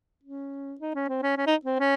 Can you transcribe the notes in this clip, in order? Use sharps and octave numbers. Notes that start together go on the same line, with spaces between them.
C#4
D#4
C#4
C4
C#4
C#4
D#4
C4
C#4